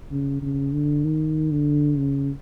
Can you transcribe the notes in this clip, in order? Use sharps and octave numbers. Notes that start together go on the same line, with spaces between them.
C#3
C#3
D3
D#3
D3
C#3